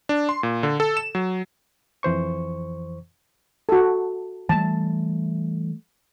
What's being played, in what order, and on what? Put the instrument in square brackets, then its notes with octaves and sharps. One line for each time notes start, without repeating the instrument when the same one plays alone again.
[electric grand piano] D4
C6
A#2
D3
A4
E7
F#3
[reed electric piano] F2 E3 C5 C#6
[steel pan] F#4 A4
[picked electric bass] E3 G3 A3 [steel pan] A5